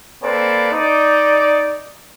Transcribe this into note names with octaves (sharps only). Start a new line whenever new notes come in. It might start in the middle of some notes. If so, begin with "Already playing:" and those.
A#3 C4 A4 B4 D5
D#4 D5